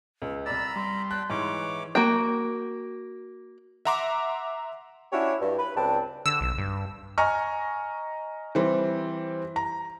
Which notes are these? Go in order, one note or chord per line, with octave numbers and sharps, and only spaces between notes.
C#2
C2 D5 A#5 B5 E6 A6
G3 C6
G5 A5 F#6
G#2 E3 C#5 D6
A#3 F#4 G5
E5 F#5 A#5 C6 D6
C#4 D4 E4 F#4 G4 C#5
G2
B4
C#2 G2 C4 D4 G5 A5
D3 E6
B1
G2
D#5 G#5 A#5 C#6 F6
E3 G3 C4
A#5